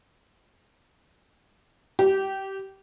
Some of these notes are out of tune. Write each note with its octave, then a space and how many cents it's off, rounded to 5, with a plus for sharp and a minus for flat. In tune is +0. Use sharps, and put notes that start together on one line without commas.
G4 -20